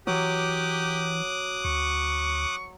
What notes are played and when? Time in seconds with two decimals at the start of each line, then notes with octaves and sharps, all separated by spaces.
0.07 E3 F#3 G4 D6 D#6 F#6
1.65 D2 C#6